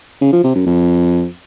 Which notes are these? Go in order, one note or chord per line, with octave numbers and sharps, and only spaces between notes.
C#3
F3
C3
F#2
F2